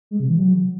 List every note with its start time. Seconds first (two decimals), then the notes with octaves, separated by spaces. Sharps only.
0.11 G#3
0.20 C3
0.29 E3
0.38 F#3